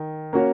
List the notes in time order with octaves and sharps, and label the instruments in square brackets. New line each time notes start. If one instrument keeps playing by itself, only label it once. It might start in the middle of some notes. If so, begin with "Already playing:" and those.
Already playing: [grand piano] D#3
A#3 C#4 F#4 C#5